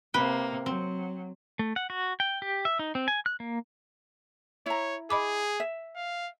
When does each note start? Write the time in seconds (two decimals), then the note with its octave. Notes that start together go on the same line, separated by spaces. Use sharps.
0.14 C3 A#3 B4 G5
0.66 F#3 C4
1.59 A3
1.76 F#5
1.90 F#4
2.20 G5
2.42 G4
2.65 E5
2.79 D#4
2.95 C4
3.08 G#5
3.26 F#6
3.40 A#3
4.66 E4 C#5 A#5
5.10 G#4 D#5 B5 D6
5.60 E5
5.95 F5